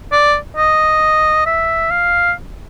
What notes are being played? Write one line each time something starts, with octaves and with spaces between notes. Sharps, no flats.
D5
D#5
E5
F5